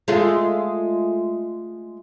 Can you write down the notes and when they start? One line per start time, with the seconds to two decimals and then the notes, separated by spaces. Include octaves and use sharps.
0.08 G#3 A3 F4